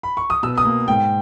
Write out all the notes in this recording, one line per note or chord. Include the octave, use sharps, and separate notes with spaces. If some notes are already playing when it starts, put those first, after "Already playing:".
B5
C#6
D#6
B2 E6
D#6
A#3
G#2 G5